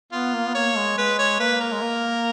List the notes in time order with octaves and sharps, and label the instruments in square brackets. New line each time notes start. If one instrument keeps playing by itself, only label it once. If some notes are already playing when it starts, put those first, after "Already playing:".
[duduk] B3 [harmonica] F4
[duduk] A#3
B3
[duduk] A#3 [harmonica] C#5
[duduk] G#3
[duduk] G#3 [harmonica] B4
[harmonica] C#5
[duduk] A#3 [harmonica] B4
[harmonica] A#4
[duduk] G#3
A#3